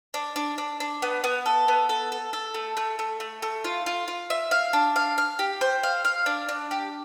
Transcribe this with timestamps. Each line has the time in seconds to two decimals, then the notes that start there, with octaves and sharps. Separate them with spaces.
0.14 D4
0.36 D4
0.58 D4
0.80 D4
1.02 B3
1.24 B3
1.46 A4
1.68 B3
1.89 A4
2.12 A4
2.33 A4
2.54 A3
2.77 A3
2.99 A3
3.20 A3
3.42 A3
3.64 F4
3.86 F4
4.08 F4
4.30 E5
4.51 F5
4.73 D4
4.96 F5
5.18 F5
5.39 G4
5.61 C5
5.83 F5
6.05 F5
6.26 D4
6.49 D4
6.71 G4